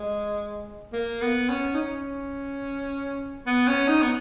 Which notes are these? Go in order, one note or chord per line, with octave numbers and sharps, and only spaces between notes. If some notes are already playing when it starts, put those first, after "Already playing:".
Already playing: G#3
A#3
B3
C#4
D#4
C#4
B3
C#4
D#4
B3